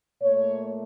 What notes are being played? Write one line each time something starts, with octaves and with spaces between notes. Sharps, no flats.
A#2 A3 C#5